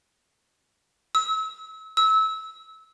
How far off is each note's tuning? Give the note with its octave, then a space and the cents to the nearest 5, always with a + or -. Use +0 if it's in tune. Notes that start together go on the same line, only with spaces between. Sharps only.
E6 -35
E6 -25